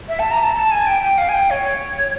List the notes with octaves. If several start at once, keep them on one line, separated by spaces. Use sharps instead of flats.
E5
A5
A#5
A5
A5
G#5
G5
G5
F5
G#5
G5
C#5